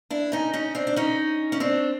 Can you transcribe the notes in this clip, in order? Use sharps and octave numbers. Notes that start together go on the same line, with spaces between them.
D4 E4
C#4 D#4
C#4 D#4
C4 D4
D4
C#4 D#4
C#4
C4 D4